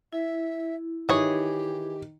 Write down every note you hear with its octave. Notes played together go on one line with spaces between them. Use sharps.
E4 E5
D#3 E3 G4 G#4 C#5